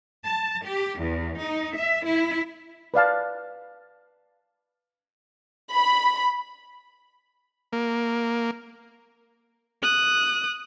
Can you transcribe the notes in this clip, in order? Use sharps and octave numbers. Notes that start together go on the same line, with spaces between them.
A5
G4
E2
D#4
E5
E4
B4 D5 F5 A5
B5
A#3
D#6 F#6